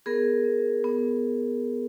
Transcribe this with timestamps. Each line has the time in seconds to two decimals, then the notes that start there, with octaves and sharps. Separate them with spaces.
0.06 B3 G#4 A#4
0.44 B3
0.84 B3